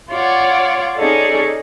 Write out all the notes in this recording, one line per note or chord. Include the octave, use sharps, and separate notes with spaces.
F4 C#5 D5 F#5
C#4 D#4 G#4 A4 C#5 D5